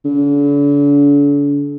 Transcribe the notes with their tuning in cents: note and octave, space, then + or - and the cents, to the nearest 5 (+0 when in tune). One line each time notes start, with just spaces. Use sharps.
D3 -40